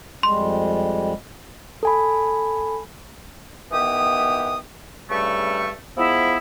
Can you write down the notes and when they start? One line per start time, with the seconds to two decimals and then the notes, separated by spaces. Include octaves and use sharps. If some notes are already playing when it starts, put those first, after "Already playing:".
0.23 F2 G3 G#3 C6
1.83 A4 G#5 B5
3.71 D#3 E3 B3 G4 D#6
5.10 G2 C#3 G3 A3 C#6
5.96 F3 G#3 B3 E4